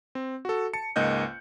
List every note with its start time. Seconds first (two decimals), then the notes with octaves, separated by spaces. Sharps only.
0.15 C4
0.45 F#4 A4
0.73 A5 C#7
0.96 C#2 G#2 A#3 D#5 F#6 G6